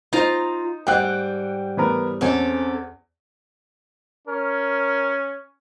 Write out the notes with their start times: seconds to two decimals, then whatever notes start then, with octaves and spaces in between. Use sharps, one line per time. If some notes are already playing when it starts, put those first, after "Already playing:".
0.13 D#4 F4 C5 A#5
0.87 G#2 G3 F#5 G5 F#6
1.77 E3 B3 A#4
2.21 E2 C4 C#4 A4
4.28 C#4 A#4